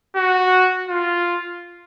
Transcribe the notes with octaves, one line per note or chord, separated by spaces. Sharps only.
F#4
F4